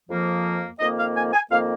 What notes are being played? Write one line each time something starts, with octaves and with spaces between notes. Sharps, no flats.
F2 F3 A#3
F2 D#3 A#3 D#5
F5
G#5
G#5
F2 D#3 A#3 F5